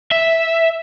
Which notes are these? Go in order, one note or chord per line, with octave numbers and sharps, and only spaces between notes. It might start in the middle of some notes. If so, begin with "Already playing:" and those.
E5